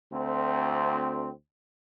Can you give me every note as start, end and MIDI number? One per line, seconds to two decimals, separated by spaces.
0.13 1.30 38
0.13 1.30 60